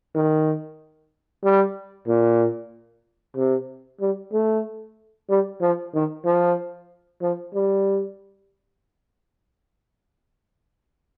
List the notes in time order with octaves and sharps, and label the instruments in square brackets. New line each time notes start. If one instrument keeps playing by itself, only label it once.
[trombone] D#3
G3
A#2
C3
G3
A3
G3
F3
D#3
F3
F3
G3